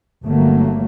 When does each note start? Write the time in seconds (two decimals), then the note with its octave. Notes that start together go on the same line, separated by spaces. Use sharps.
0.24 G1 D3 F#3 A3 A#3